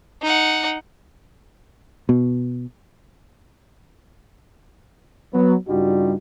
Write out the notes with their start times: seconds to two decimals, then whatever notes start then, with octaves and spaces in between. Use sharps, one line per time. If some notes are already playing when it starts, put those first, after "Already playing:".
0.22 D#4 F#5
2.09 B2
5.33 F#3 B3
5.67 G2 C#3 G3 D#4 F4 F#4